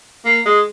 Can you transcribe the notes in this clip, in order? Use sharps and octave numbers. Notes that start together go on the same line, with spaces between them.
A#3
G#3